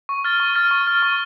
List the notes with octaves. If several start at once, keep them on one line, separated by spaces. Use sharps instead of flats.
C#6
F6 A6
C#6
F6 A6
C#6
F6
C#6